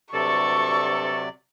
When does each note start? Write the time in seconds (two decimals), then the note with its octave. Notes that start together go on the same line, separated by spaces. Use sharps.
0.13 D2 G2 C3 F#3 A4 D5 C#6